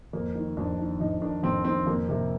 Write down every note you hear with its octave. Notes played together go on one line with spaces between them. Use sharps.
F2 A#3
D#3
F2 D4
D#3
F2 D#4
D#3 D4
F2 C4
D#3 C4
F2 A#3
C3 A#3